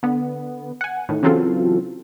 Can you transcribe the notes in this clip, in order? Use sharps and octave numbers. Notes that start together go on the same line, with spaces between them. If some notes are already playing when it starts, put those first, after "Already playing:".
D3 B3
F#5 G#5
A2 D#3
C#3 E3 F#3 C4 F4 A4